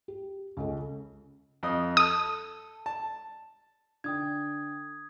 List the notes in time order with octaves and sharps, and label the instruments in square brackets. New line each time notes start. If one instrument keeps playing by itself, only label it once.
[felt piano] G4
C#2 C#4 A4
[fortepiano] F2 D#5 D#6
[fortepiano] A4 [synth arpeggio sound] D#6
[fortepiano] A5
[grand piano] D3 G5 [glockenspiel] D#6 G#6